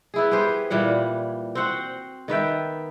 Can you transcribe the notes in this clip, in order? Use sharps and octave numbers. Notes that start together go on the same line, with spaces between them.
B3 E4 G#4
B3 G4 G#4 C5
A#2 E3 G3 F#5
C4 F#4 C5 F#5
D#3 B3 E5 G5